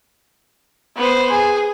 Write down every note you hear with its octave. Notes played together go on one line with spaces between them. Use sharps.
B3 C5
G#4